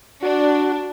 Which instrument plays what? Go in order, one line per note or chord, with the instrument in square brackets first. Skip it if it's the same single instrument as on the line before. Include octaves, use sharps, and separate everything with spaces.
[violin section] D4 [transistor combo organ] F#4